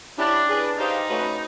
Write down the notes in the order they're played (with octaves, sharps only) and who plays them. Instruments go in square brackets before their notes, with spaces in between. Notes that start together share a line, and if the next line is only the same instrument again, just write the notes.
[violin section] C#4 E4 G4 [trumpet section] D4
[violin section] G#4 B4 D5
[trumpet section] D#4 [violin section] G4 C5 F5
[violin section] A3 C#4 F#4 B4